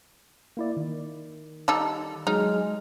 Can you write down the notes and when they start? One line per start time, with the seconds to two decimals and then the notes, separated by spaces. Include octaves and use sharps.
0.57 A#3 E4 D5
0.77 D#3
1.68 G3 D#4 A4
2.27 F#3 G#3 D#4 G#4 F6